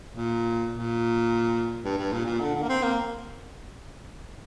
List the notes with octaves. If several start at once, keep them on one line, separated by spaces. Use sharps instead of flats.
A#2
A#2
G2
G2
A#2
A#2
D3
D3
A#3
C4
A#3